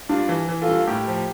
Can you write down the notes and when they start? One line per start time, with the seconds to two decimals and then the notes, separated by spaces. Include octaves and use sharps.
0.09 G2 D4 F4
0.29 E3
0.49 E3
0.62 F4 A4
0.68 G2
0.87 A2 G4 A#4
1.07 F3